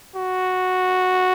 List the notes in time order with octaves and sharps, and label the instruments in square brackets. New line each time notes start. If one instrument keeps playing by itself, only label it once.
[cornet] F#4